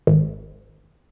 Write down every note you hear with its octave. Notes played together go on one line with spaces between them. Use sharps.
G#1